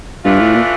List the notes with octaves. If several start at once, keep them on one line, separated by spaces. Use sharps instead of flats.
G2 E3 A3 D4 F4
A2
A#2